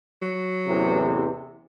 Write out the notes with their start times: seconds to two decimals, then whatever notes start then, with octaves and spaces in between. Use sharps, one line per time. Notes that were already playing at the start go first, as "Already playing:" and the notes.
0.22 F#3
0.67 A1 E2 C3